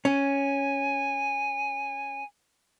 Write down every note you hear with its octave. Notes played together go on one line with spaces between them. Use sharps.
C#4 G#5